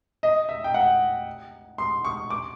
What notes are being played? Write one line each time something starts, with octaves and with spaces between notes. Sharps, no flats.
D#5
E5
G5
F#5
C6
C#6
D6